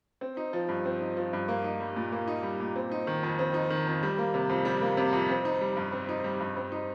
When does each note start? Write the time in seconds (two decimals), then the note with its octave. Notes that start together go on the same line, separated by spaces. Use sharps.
0.21 C4
0.37 D#4
0.53 F3
0.69 G2
0.85 C4
1.01 D#4
1.17 F3
1.33 G2
1.48 A#3
1.64 D#4
1.80 G3
1.96 A#2
2.12 A#3
2.28 D#4
2.43 G3
2.60 A#2
2.76 C4
2.91 D#4
3.07 D#3
3.23 F2
3.39 C4
3.54 D#4
3.70 D#3
3.87 F2
4.03 G3
4.18 A#3
4.34 C3
4.49 F2
4.65 G3
4.82 A#3
4.97 C3
5.13 F2
5.29 C4
5.45 D#4
5.61 G3
5.77 G2
5.92 C4
6.09 D#4
6.24 G3
6.40 G2
6.57 C4
6.72 D#4